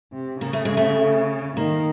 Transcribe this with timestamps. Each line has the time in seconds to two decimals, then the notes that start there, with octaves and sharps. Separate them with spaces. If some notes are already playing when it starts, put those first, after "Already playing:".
0.13 C3
0.41 C#3 A#3
0.53 A3
0.65 G#3
0.77 A3
1.57 D#3 A#3